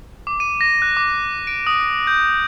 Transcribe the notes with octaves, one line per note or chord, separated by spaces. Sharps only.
D6
D#7
A#6
F#6
D6
D7
D#6
G6